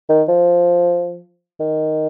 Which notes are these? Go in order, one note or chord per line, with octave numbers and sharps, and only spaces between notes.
D#3
F3
D#3